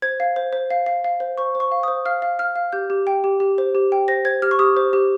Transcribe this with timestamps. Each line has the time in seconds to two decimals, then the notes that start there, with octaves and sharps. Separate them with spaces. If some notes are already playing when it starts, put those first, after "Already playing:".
0.02 C5 G#6
0.20 F5
0.36 C5
0.53 C5
0.70 F5
0.86 F5
1.04 F5
1.20 C5
1.38 C5 C#6
1.55 C5
1.60 C#6
1.72 F5
1.83 C5 D#6
2.05 F5 F6
2.22 F5
2.39 F5 F6
2.56 F5
2.72 G4 G6
2.90 G4
3.07 G5
3.24 G4
3.40 G4
3.58 C5
3.75 G4
3.92 G5
4.08 C5 A#6
4.25 C5 G#6
4.42 G4 F6
4.51 C#6
4.59 G4 D#6
4.77 C5
4.93 G4